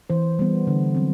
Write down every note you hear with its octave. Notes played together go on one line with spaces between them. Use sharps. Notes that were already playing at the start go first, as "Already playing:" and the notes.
E3 C5
G3 B3
D3
F#3 C4